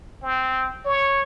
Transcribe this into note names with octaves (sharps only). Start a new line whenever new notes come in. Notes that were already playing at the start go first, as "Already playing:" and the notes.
C4
C#5